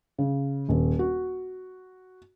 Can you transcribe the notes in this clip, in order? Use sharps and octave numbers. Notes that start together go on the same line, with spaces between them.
C#3
D#1
F#4